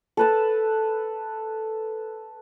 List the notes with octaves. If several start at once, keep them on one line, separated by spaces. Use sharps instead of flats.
A4 B4 A5